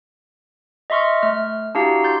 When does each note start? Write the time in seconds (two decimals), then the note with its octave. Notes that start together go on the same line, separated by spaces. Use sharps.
0.90 D#5 E5 C6 C#6 F6
1.23 A3 F6
1.75 D4 E4 F#4 G4 F5 A#5
2.04 C6 G6 A6